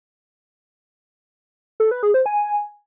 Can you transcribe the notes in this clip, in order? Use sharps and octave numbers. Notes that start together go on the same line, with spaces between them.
A4
B4
G#4
C5
G#5